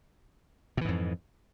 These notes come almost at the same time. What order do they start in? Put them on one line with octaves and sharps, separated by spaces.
B2 E3 G#2 F2